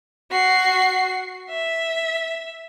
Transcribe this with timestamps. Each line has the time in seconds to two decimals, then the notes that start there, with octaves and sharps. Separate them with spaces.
0.31 F#4 C7
1.50 E5